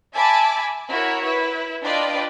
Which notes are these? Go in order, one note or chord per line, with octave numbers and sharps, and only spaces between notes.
E5 G#5 A5 B5 D6
E4 F#4 A#4 C#5
E4 B4
D4 F4 B4 D5 D#5 G5